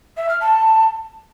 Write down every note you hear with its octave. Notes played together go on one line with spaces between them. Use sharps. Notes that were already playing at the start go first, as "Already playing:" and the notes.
E5
F6
A5